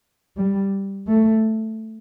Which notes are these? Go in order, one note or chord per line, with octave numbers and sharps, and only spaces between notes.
G3
A3